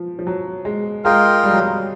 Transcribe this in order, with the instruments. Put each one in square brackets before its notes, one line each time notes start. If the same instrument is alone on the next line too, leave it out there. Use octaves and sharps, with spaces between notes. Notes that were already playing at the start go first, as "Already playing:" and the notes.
Already playing: [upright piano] F3
F3
F#3
G#3
[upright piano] G#3 [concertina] F4 A#4 D#5 G5
[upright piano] G3
F#3
G3